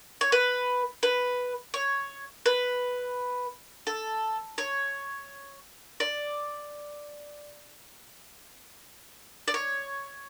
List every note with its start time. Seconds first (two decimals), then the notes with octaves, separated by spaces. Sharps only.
0.21 C#5
0.32 B4
1.03 B4
1.74 C#5
2.46 B4
3.87 A4
4.58 C#5
6.00 D5
9.48 D5
9.54 C#5